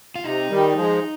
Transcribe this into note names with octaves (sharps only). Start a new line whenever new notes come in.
F4
C3 D#4
D#3 G3
F3 G#3